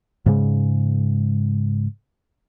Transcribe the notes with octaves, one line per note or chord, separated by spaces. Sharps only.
G#2 C#3 G#3